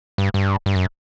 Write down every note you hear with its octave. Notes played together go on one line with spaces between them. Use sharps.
G2
G2
G2
F#2